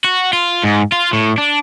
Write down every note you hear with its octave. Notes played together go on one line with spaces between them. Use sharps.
F#4
F4
G#2
F4
A2
D4